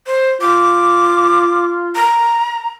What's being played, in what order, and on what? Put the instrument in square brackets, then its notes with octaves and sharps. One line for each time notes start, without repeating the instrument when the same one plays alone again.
[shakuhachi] C5
[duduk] F4 [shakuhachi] D6
[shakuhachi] A#5